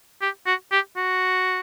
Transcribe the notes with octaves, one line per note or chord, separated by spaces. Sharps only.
G4
F#4
G4
F#4